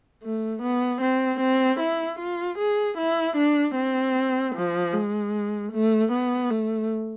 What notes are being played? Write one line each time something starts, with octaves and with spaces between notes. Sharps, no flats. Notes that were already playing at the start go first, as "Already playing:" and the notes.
A3
B3
C4
C4
E4
F4
G#4
E4
D4
C4
F3
G#3
A3
B3
A3